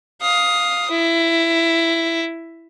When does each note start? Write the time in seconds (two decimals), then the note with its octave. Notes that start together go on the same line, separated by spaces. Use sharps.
0.22 F5 D#6
0.91 E4